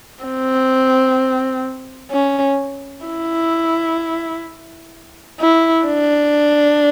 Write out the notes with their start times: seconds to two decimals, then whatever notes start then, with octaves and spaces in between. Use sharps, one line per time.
0.24 C4
2.11 C#4
3.06 E4
5.40 E4
5.86 D4